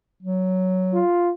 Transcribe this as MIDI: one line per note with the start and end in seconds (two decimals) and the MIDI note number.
0.22 1.02 54
0.93 1.31 65